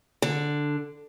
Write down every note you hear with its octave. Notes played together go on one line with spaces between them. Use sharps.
D3